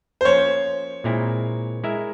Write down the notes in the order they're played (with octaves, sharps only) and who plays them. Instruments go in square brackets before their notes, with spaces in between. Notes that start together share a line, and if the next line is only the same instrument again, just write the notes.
[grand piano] C5
[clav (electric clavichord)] F3 A#3 C#4 [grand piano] C#5
[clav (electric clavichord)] A#2 G#3 C4 E4 A#4
G#3 E4 A#4 E5